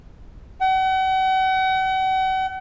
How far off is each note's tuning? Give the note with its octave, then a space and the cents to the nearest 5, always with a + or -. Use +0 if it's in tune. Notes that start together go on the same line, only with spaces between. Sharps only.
F#5 +40